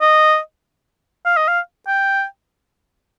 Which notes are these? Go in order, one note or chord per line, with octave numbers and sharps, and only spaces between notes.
D#5
F5
D#5
F5
G5